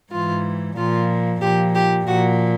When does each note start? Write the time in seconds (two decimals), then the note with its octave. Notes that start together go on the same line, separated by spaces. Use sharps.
0.11 G#2 E3 F4
0.77 A#2 F3 F4
1.41 A#2 F3 G4
1.74 G4
2.07 A#2 F3 F#4